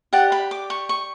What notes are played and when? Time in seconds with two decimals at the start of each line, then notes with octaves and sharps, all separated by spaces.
0.13 G4 D5 F#5
0.32 B5
0.51 D6
0.70 C#6
0.89 C#6